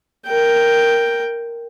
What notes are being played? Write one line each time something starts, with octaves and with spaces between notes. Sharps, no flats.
A#4 G5